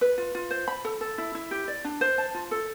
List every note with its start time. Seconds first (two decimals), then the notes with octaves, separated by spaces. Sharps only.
0.01 B4
0.18 F4
0.35 F4
0.51 C5
0.68 B5
0.85 A4
1.01 A4
1.18 E4
1.35 E4
1.51 G4
1.68 D5
1.85 D4
2.01 C5
2.18 A5
2.34 F4
2.51 A4